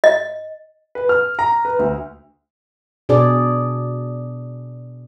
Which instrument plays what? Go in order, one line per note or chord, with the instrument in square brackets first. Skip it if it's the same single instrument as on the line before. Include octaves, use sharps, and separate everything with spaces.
[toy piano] D#5
[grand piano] B4
F6
A#5
B4
D2
[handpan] B2 D4 G#4 D5